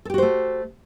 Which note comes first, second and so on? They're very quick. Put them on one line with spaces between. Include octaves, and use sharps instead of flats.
A4 G4 F#4 C5 A3